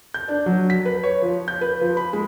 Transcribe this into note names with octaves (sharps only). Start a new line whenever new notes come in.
G6
D4
F#3
B6
B4
C#5
F3
G6
B4
F3
B5
G#3